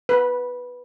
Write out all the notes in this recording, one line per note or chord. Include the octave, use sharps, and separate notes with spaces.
B4